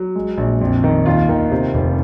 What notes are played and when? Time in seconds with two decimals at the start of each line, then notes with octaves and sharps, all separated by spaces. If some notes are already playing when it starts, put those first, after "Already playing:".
Already playing: F#3
0.16 G#3
0.37 A#1
0.61 F2
0.84 D#3
1.06 D#2 F4
1.29 D#3
1.51 C3
1.74 F1